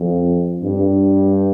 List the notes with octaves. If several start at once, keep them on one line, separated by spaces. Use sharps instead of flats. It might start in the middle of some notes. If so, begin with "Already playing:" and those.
Already playing: F2
G2